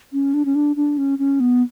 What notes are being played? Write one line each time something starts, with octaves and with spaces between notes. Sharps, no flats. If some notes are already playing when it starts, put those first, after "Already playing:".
C#4
D4
C#4
D4
D4
C#4
C#4
B3